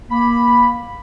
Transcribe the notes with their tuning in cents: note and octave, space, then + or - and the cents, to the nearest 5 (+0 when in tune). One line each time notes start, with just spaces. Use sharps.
A#3 +20 B5 +0